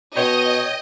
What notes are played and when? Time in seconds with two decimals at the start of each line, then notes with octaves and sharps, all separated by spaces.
0.17 B2 C#5 D#5 G5